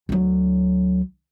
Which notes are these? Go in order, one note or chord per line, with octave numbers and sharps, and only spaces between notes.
D2 F#3